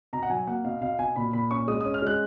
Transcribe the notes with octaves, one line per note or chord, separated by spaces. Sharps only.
B2 A#5
F#5
F#3 G#5
A#3 F#5
B2 F5
B2 F5
B2 G#5
A#2 B5
A#2 B5
C#4 C#6
G#3 D#6
C#4 D#6
F6
G#3 F#6